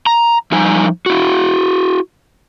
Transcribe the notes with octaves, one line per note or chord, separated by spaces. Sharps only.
A#5
F3 G3 D#4 G#5 A#5
E4 F#4